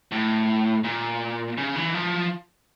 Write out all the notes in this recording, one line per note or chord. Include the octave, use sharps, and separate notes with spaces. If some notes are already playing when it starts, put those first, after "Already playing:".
A2
A#2
C#3
E3
F3